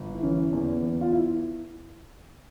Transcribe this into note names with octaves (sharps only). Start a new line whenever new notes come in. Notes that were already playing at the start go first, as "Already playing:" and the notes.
Already playing: G1
E4
E3 C#4
E2
E2
F4
E4